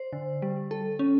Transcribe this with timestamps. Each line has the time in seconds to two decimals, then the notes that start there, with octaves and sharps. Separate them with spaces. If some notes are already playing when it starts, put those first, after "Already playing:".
Already playing: C5
0.13 D3
0.42 G3
0.71 A4
0.99 C#4